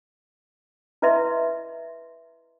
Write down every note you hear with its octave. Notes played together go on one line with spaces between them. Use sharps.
E4 B4 D#5 E5 C6